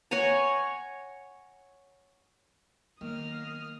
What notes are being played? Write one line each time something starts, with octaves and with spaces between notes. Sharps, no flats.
C#5 F#5 G#5 A#5
D#3 F#3 A#3 B3 D#6 F6